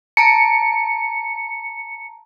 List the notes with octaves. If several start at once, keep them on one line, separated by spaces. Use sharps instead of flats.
A5 A#5 C#7 D7